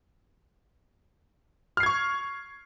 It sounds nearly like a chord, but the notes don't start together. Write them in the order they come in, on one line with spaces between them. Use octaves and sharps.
F6 C7 G#6 C#6